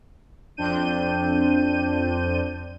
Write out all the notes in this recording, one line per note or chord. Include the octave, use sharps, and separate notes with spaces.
F2 C4 D4 G6 D#7